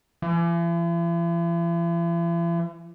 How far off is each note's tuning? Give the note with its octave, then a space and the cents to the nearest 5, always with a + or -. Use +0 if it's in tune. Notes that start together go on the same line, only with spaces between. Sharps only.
E3 +45